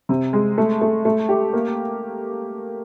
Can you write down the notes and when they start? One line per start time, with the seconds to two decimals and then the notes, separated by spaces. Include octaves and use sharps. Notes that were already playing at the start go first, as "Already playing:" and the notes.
0.09 C3
0.33 G#3
0.58 A3
0.81 A3
1.05 A3
1.29 G4
1.53 A#3